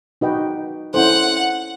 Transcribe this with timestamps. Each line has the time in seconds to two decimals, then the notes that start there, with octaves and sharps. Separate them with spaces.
0.21 D#4 F#4 B4 D#5 G5
0.94 C#4 E4 A4 C5 F#5